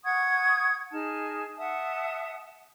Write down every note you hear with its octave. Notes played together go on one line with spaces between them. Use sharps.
F#5 C#6 D#6 G#6
D#4 G#4 A5 F6
E5 F#5 A5 D#6